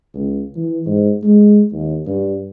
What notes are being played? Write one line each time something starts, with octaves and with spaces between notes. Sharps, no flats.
C#2
E3
G#2
G#3
D#2
G2